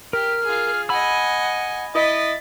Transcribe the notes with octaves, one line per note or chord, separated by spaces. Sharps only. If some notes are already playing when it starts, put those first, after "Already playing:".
G4 A#4 F6
F4 G#4
D#5 F#5 G#5 B5 E6
E4 D#5 A6 B6